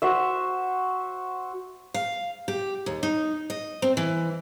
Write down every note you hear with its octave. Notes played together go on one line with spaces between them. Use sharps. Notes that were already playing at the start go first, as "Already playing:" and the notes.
F#4 C5 E5
F5
G4
D#2
D#4
D#5
C4
E3